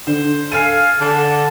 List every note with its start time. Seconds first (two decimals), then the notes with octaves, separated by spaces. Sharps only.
0.07 D3 C5
0.52 A4 F5 G#5 F6 C7 D#7
0.99 D3 A5